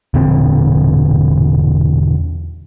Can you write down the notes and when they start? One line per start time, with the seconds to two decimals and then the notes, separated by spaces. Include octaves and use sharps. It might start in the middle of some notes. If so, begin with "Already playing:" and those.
0.14 E1 A#2 D3 C4